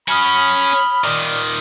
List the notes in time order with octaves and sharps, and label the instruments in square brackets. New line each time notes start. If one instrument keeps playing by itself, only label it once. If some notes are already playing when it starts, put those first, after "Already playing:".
[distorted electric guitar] C#4 F#4 [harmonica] B5 [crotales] D#6 F6 F#7
[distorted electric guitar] A#2 D#3 [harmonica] D5